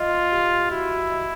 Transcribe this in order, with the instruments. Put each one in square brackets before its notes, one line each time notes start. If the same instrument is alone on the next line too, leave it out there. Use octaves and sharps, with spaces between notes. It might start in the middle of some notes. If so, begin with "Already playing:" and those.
Already playing: [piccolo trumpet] F4 [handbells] D#5
[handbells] G4
[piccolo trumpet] E4 [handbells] F#4
[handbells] D#5